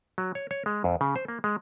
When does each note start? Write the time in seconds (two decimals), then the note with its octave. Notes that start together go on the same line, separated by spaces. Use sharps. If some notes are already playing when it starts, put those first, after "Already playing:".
0.18 F#3
0.35 C#5
0.51 C#5
0.66 G#3
0.84 F2
1.01 C#3
1.16 C5
1.28 A#3
1.44 G#3